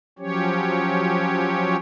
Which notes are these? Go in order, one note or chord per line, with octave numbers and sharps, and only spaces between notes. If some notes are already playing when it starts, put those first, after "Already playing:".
F3 F#3 C#4 G4 C#5